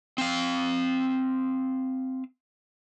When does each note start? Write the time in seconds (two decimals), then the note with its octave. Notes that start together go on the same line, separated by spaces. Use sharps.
0.18 C4 F5